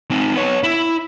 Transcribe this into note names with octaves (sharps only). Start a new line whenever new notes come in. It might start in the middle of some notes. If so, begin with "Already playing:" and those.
C4 D#4
B3 C#5
E4